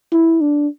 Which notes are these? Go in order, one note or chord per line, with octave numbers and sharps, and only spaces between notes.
E4
D4